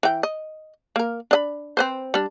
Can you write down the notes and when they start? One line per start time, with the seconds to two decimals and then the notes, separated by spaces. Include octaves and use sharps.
0.03 E3 G5
0.23 D#5
0.96 A#3 A#4
1.31 D4 D#5 B5
1.77 C4 B4 C5
2.14 G3 D4